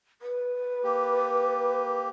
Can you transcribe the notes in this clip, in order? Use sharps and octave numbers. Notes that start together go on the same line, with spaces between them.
B4
A#3 G4